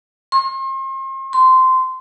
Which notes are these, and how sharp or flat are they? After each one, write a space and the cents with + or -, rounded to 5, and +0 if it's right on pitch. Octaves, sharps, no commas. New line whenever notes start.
C6 +40
C6 -15